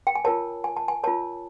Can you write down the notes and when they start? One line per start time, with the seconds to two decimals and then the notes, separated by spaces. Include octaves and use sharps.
0.07 G5
0.15 G#5
0.25 F4 A#4 C#5 A5
0.64 G#5
0.77 A5
0.88 G#5
1.04 F4 A#4 C#5 A5